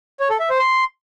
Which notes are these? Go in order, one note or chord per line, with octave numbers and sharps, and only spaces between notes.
C#5
A4
E5
C5
C6